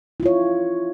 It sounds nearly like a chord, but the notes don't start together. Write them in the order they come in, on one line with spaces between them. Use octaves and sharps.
E4 F4 C#5